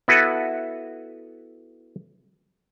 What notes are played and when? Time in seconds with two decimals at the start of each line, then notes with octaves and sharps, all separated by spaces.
0.08 B3 E4 F#4 A4 B4